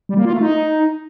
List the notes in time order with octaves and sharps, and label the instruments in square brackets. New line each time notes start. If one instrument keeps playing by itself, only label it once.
[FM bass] G3
A#3
F4
A3
D#4